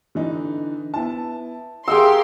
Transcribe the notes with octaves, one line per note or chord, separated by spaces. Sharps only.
D3 E3 D#4
B3 E4 A5
G4 G#4 A#4 F5 F#5 C6 E6